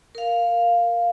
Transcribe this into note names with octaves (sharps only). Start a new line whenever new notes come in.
A#4 F5